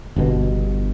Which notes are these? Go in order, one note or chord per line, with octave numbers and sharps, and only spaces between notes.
G1 G2 B2